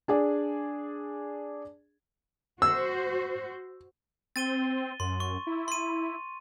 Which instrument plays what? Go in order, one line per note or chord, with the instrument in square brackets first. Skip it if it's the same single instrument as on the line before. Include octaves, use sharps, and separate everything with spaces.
[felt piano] D4 G#4 D5
[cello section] F#4 C5 [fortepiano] E6
[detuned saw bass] C4 [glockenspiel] A6 D#7 G7
[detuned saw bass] F#2 [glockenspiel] C6
[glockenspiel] C#6
[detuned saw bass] E4
[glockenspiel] C6 D#7